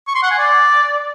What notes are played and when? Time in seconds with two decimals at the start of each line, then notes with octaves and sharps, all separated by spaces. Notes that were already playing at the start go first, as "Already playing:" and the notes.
0.07 C#6
0.15 C6
0.23 F#5
0.30 G#5
0.38 D5